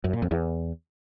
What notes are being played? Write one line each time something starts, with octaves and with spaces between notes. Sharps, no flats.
F#2
A#2
F2
E2